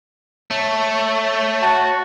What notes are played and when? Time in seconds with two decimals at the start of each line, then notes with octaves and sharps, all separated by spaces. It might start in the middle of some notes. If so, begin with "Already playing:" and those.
0.51 A3 C#5
1.63 F#4 A5 A6